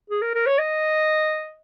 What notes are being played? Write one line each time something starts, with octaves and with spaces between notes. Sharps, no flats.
G#4
A#4
A#4
C#5
D#5